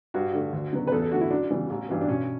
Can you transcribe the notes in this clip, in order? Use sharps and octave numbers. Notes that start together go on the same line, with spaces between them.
G2 F#4
D3 A3
D2
C#3 F#3 B3
B4
E2 A4
A4
D3 A3 F#4
E4
F#2 D4
C#3 E3 G3 B3
A1
G2 E3 B3
D4
B1 C#4